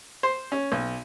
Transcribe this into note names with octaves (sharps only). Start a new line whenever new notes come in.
C5
C#4
B1